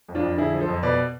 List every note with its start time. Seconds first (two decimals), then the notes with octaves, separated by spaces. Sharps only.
0.09 F2
0.15 D4 F4
0.23 F2
0.38 D3 E4 G#4
0.53 F3
0.60 A4 C5
0.69 F2
0.83 B2 B4 D5